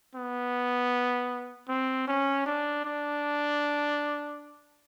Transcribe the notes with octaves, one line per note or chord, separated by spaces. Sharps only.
B3
C4
C#4
D4
D4